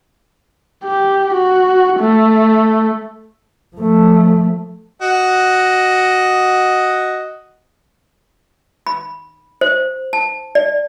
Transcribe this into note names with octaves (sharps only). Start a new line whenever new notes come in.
G4
F#4
A3
F3 A3
F#4 D#5
B5
C5
A5
D5